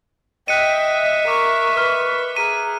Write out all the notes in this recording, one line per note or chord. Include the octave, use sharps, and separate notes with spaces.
D#5 E5 G5 F#6 C#7 D#7
A#4 C#6 D6
B4 F6
G#4 A#5 F6 D#7